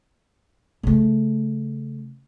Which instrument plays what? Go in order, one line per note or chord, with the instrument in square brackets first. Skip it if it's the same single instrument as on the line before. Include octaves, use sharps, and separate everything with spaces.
[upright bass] C#3 A3